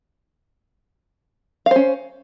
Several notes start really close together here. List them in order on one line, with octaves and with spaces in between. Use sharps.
F5 C5 C#4